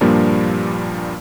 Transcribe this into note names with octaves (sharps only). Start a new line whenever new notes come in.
G2 A#2 F3 G3 A#3 D4